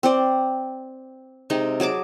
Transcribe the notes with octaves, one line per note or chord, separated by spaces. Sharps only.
C4 C5 D5
C3 G#3 D#4
F#3 G#4 A5 D6